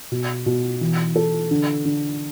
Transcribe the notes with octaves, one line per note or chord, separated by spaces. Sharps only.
B2
B2
E3
A4
D3
D3